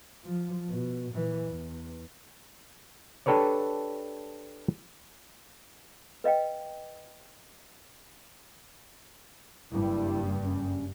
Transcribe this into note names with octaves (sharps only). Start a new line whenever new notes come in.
F3
B2
A#2 E3
E2
D4 G4 A4 B4 C#5 D5
B4 D#5 F5 G5
F#1 G2 G3 E4
C#4